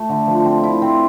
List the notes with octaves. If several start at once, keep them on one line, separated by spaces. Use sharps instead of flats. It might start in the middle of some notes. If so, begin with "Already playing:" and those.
Already playing: A3
D3
F3
C4
E4
C4